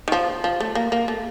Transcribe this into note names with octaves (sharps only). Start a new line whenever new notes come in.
D#3
F3
F3
A3
A#3
A#3
A3